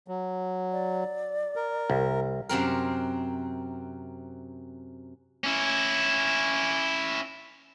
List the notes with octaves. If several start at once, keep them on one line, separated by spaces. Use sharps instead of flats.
F#3
D5
A#4
C2
F#2 C3 C4 A#4
C#4 E4